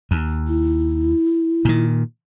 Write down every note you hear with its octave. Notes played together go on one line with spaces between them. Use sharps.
D#2
E4
A#2 D#3